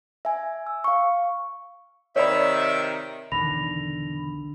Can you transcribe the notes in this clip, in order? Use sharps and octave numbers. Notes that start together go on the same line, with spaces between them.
E5 G#5
E6
F5 C#6
C3 D#3 C#5 D5 E5 B5
B1 E2 D3 D#3 B5 A#6 F7